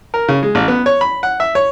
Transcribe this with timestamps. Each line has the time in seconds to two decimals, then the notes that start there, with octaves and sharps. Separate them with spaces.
0.14 A#4
0.28 C#3
0.43 G#3
0.55 A1
0.68 B3
0.86 C#5
1.01 B5
1.23 F#5
1.40 E5
1.55 C#5